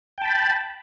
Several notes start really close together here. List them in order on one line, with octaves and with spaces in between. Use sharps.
G5 A5 B5